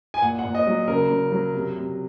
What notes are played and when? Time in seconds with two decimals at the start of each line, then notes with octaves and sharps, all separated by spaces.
0.14 G#5
0.22 A#2 F#5
0.39 F#5
0.45 A#2
0.55 D#5
0.67 F#3
0.87 C#3 A#4
1.09 C#3
1.32 F#3
1.54 C3
1.76 C3